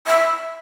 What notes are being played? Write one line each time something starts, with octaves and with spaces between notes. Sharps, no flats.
E5